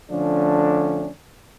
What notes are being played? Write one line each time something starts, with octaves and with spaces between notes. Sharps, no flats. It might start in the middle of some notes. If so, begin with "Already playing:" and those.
D3 F3 A3 C#4 D4